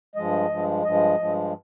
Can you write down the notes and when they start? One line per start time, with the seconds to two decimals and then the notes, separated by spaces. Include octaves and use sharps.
0.16 G2 F3 G#3 D#5
0.50 G2 F3 G#3
0.84 G2 F3 G#3 D#5
1.19 G2 F3 G#3